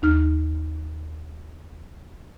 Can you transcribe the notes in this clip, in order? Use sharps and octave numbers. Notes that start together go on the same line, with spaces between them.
D#2 D#4 F6